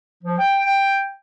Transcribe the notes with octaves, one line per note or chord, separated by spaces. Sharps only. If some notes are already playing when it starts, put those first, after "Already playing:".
F3
G5